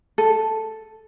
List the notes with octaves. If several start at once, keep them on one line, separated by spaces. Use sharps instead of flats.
A4